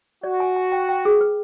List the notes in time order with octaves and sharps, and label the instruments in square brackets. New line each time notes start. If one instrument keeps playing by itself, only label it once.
[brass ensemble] F#4 [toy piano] D5
[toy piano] G#5
G#5
G5
G5
G#4
B4